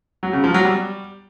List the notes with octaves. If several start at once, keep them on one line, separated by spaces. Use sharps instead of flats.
F#3
C#3
F3
F#3
G3